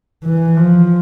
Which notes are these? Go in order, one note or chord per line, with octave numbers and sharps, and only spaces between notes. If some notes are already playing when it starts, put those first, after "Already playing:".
E3
F3